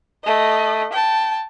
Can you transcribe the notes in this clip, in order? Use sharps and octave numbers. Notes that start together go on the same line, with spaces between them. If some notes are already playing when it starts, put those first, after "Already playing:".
A3 D#5
G5 A5